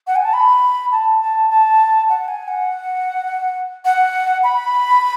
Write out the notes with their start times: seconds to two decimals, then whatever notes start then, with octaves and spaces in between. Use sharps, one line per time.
0.07 F#5
0.15 G#5
0.24 A5
0.33 B5
0.92 A5
1.21 A5
1.50 A5
2.09 F#5
2.28 G#5
2.48 F#5
3.85 F#5
4.43 B5